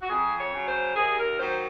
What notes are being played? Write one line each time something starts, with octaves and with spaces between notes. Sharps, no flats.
F#4
F2 G#4
C#5
C#3 F#3
C5
D#2 G#4
A#4
D#3 F#3 C5